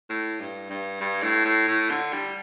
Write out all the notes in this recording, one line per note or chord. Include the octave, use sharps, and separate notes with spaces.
A2
G2
G2
G2
A2
A2
A2
D3
G3